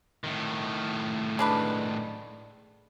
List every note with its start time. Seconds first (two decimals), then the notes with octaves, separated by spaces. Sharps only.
0.24 A2 D#3
1.39 G#3 D4 B4